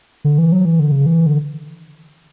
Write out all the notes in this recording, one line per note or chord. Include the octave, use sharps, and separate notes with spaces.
D3
E3
F#3
E3
D3
C#3
E3
D3